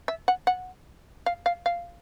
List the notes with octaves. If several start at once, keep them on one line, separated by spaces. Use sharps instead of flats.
E5
F#5
F#5
F5
F5
F5